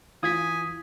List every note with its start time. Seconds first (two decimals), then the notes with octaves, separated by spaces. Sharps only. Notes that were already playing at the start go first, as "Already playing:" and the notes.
0.23 E3 F4 G#5 D#6 G#6 B6